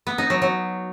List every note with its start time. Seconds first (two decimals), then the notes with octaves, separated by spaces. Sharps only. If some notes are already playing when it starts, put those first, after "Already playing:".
0.07 B3
0.18 D#4
0.30 F#3
0.42 F#3